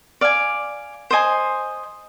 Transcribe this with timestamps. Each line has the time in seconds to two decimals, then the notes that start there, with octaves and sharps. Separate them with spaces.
0.21 D5 F5 G#5
1.11 C5 D#5 G#5 C6